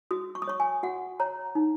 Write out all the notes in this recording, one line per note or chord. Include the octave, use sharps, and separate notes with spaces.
F#4 D#6
C#6
D#6
C#5 C#6
G#5
F#4 F#5
C#5 A#5
D#4